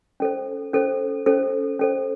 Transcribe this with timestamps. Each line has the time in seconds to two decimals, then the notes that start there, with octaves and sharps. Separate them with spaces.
0.20 C#4 A4 C5
0.73 C#4 A4 C5
1.26 C#4 A4 C5
1.79 C#4 A4 C5